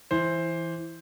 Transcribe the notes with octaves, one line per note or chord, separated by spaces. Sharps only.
E3 C5